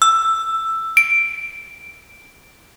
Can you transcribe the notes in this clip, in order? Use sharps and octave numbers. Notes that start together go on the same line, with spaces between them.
E6
D7